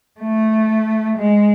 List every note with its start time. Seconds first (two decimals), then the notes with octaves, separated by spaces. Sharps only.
0.20 A3
1.17 G#3